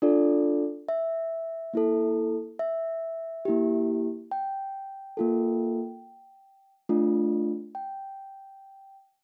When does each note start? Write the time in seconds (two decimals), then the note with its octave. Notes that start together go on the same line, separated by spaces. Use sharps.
0.02 D4 F4 A4 D5
0.89 E5
1.74 A#3 E4 A4
2.59 E5
3.45 A#3 E4 G4
4.31 G5
5.17 A#3 F4 A4
6.89 A3 D4 F4
7.75 G5